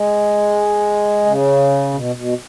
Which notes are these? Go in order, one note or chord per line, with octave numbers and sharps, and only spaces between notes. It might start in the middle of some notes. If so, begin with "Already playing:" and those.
Already playing: G#3
C#3
B2
B2